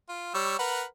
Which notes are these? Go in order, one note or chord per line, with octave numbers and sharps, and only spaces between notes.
F4
G3 C#5 E6
A#4 B4 F#5